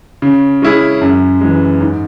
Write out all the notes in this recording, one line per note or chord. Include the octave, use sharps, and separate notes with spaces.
C#3
G#3 C#4 E4 G#4
F#2
E3 G#3
G#2